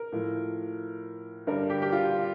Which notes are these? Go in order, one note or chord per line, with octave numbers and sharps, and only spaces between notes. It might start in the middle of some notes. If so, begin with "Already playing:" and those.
Already playing: A#4
A2 F3
G2 D3 G3 A#4
G4
G4
F4